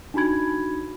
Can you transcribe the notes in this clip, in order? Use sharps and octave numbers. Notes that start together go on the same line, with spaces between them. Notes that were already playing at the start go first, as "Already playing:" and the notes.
D4 D#4 F#4 B5 G#6